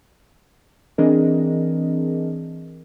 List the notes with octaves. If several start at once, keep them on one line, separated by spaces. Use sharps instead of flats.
E3 C4 D4 G#4 A#4 D#5